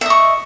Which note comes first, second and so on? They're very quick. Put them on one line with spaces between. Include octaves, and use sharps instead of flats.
E5 D#5 C#6